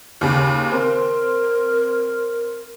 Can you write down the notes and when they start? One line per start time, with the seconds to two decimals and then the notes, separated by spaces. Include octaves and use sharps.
0.21 D#2 C#3
0.71 C4 A#4